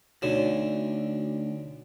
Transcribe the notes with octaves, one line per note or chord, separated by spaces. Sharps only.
D2 B2 D3 D#4 C#5 E7